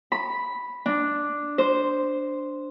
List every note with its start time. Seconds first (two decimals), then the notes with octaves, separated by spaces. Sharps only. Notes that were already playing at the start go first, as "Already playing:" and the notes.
0.12 B5
0.86 D4
1.58 C5